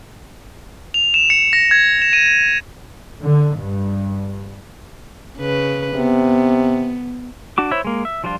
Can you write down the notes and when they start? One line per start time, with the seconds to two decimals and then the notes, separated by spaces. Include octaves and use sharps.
0.94 F7
1.14 E7
1.30 C#7
1.53 A#6
1.71 G#6
2.02 E7
2.13 D#7
3.21 D3
3.57 G2
5.38 C#3 B4
5.96 C3 B3
7.58 D4 F#4 D6
7.71 E4 C5 C#5 E5
7.85 G#3 A#3
8.05 E5
8.24 F3 G3 D4 F4